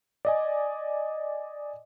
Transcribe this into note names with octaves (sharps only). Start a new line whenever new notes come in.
D5 D#5 G#5